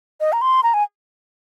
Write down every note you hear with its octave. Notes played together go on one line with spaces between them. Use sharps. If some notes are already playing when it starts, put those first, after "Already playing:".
D#5
A#5
C6
A#5
G#5